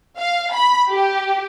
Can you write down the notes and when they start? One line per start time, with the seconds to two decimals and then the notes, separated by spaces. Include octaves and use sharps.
0.18 F5
0.54 B5
0.90 G4